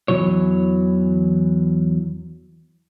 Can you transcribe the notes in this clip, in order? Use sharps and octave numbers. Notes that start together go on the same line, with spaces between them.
E2 C#3 E3 F#3 C#5